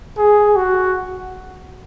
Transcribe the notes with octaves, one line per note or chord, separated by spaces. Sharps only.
G#4
F#4